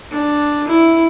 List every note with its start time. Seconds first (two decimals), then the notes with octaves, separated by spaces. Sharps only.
0.11 D4
0.68 E4